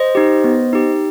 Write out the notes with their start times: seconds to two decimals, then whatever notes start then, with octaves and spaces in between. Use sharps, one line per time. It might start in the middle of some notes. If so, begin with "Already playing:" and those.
Already playing: C5 D#5
0.15 D#4 G4
0.44 B3
0.73 D#4 G4